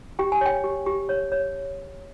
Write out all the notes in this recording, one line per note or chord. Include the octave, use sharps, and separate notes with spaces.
G4 G5
G#5
C#5 G5
G4
G4
C#5
C#5